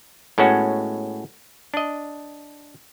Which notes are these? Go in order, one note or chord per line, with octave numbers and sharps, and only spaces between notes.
A2 G#3 B3 C#4 F#4
D4 D#5